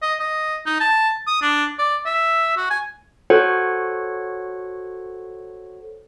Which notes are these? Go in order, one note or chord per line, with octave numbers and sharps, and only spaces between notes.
D#5
D#5
D#4
A5
D#6
D4
D5
E5
F#4
G#5
F#4 A4 C5 C#5 F#5